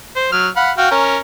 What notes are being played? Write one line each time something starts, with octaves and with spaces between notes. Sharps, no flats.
C5
F#3 F6
F5 F#5 B5
F#4 F5 G5
C#4 A#4